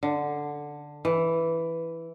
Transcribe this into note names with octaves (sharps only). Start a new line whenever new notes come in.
D3
E3